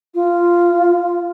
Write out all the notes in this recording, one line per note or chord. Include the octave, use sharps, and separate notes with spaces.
F4